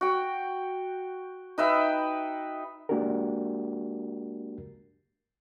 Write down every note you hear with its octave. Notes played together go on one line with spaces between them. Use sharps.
F#4 G5
D#4 B4 E5 G5
G#3 A#3 D4 F#4 G4 A#4